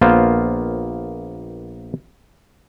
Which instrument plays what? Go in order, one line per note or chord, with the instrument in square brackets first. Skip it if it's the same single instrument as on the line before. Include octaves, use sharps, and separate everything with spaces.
[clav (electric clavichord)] A#1 A#3 B3 F4 C5